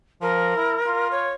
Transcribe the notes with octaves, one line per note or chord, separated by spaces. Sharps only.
F3 A#4
E4
F4
C#5